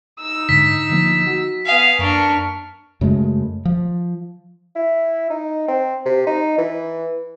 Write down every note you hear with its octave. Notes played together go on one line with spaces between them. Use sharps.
D#4 E6
G#2 D3 B6
D3 F3 A#3
F#4
B3 F5 G#5 D#6
F#2 A#3 D4 C#6 F6
F#2 C#3 G#3 A3
F3
E4
D#4
C4
C3
D#4
E3